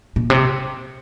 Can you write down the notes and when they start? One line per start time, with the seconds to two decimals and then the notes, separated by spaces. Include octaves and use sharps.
0.16 A#2
0.30 C3